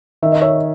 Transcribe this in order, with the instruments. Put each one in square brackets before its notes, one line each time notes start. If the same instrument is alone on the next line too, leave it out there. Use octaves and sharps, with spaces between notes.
[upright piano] D#3 [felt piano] E5
[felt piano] D#5
C#5 E5